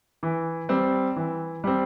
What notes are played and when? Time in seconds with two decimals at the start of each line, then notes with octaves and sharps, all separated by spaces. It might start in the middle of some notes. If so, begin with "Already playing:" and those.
0.23 E3
0.69 G3 C4
1.16 E3
1.64 G3 C4